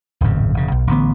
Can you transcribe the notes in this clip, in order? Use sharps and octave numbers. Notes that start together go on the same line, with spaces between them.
D1 G#1 F2 C#3
E1 C#3
B1
A1 G2 D3 B3